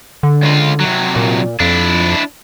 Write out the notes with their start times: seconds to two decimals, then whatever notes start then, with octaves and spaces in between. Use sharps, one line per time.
0.23 D3
0.43 C#2 F4
0.80 C3 F#3
1.16 A#2
1.60 F2 D4 E4